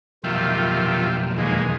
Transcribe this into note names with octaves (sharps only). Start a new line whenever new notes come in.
B1 F2 C3 D#3 F4 E5 F5 G5
E2 D#3 E3 G#3 A#3 G#4